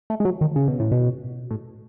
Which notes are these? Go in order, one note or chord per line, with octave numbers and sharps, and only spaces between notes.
A3
G#3
F#3
D#3
C#3
B2
A2
B2
A2